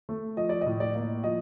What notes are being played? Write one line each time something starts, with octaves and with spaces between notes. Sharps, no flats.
A3
F3 D#5
D5
D#5
A2
D5
A#3
F3 D#5